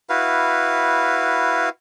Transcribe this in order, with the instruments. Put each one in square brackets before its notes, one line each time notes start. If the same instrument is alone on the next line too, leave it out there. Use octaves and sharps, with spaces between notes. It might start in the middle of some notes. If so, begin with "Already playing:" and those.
[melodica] E4 F#4 B4 F5